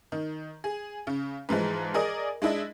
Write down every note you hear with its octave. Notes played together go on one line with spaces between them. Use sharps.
D#3
G#4
C#3
G#2 E3 F3 G#3
G#4 A#4 D5 D#5 D#6
G#3 D4 E4 D#5